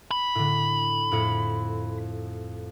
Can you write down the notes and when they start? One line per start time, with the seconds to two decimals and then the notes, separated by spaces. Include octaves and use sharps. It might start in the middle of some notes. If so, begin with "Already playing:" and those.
0.11 B5
0.35 A2 D3
1.12 F2 A2 C#7